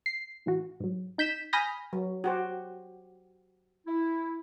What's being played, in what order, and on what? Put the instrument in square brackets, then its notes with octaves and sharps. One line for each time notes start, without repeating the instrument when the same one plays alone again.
[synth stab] C7
A2 E3 F#4
G#2 F#3
D#4 G6 B6 E7
G#5 B5 D#6 F6 G6 A#6
[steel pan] F#3
F#4 G4 C5
[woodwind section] E4